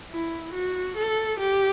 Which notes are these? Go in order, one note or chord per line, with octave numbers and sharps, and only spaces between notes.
E4
F#4
A4
G4